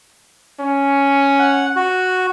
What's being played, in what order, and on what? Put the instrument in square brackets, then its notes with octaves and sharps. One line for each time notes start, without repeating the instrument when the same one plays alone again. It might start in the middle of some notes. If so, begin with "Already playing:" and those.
[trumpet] C#4
[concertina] F#5
F#4